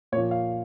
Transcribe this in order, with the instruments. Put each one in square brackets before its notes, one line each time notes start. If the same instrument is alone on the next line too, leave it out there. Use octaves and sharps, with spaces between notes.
[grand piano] A#2 C#5
F3
F5